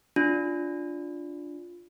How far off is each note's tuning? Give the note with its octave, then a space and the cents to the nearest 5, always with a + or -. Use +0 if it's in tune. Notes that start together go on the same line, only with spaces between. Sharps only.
D4 -5 F4 +0